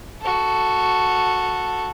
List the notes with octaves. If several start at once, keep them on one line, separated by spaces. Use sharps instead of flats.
F#4 A4